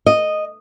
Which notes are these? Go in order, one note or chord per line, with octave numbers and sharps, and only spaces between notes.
D#5